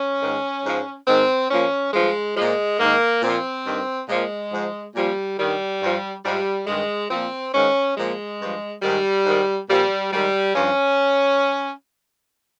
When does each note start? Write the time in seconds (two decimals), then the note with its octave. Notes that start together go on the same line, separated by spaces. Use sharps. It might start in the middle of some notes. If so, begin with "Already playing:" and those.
Already playing: C#4
0.21 G#2 D#3
0.65 G#2 F3
1.07 G#2 D#3 C4
1.50 A#2 F3 C#4
1.93 G2 F3 G#3
2.36 A#2 F3 G#3
2.79 G#2 A#3
2.85 D#3
3.22 A#2 F3 C4
3.65 G2 D#3
4.08 A#2 F3 G#3
4.52 G#2 F3
4.95 A#2 F3 G3
5.38 G2 D#3 G3
5.81 G2 F3
6.24 G#2 F3 G3
6.67 G2 D#3 G#3
7.10 A#2 F3 C4
7.54 G#2 D#3 C#4
7.96 A#2 F3 G#3
8.39 G2 F3
8.82 G#2 D#3 G3
9.26 G#2 D#3
9.68 A#2 F3 G3
10.11 G#2 D#3 G3
10.54 G2 F3 C#4